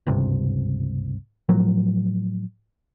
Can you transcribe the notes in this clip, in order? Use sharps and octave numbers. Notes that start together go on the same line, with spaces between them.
G#1 C#2 G2 C3
A2 F3 F#3